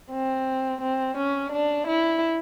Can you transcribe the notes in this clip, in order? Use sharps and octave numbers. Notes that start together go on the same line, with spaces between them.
C4
C4
C#4
D4
E4